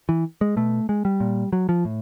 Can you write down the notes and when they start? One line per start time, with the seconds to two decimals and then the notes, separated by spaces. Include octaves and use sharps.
0.09 E3
0.41 G#3
0.56 B2 A3
0.89 G#3
1.05 G3
1.20 A#2
1.53 F#3
1.69 F3
1.85 A2